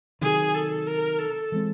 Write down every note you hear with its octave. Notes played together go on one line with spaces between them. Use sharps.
C3 D#3 F#3 G#4
A4
A#4
A4
E3 G#3 C4